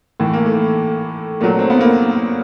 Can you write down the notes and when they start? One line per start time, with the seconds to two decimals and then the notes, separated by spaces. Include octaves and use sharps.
0.20 A2 E3 A3
0.33 A#3
0.46 A3
1.41 A#2 F#3 A3
1.59 C4
1.70 B3
1.81 A#3